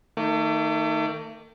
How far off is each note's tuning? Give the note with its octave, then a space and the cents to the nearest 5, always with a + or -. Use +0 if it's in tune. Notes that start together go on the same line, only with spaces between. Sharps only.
D#3 +5 A3 +35 D6 +0